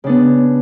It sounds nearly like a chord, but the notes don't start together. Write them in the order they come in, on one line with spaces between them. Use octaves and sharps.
C#3 D4 B3